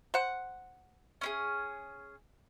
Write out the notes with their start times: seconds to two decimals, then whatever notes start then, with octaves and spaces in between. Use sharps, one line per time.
0.14 C5 F#5
1.21 C#4 E4 G#4